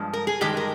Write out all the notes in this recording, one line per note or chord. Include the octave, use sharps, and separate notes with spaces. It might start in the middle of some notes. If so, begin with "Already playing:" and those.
Already playing: G2 F3 G#3
A#4
G#4
G2 D#3 G#3 G4
A#4